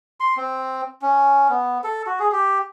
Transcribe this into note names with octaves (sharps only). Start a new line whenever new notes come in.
C6
C4
C#4
B3
A4
F#4
G#4
G4